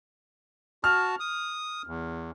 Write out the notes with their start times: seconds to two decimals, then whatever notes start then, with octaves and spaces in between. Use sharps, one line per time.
0.84 F#4 A5 F6
1.20 D#6
1.87 E2